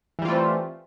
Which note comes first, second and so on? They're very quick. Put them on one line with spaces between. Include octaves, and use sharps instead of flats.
E3 G3 F4 A3 C4